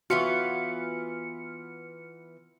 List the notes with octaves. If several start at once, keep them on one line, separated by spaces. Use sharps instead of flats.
E3 B3 F4 F#4 F6 C#7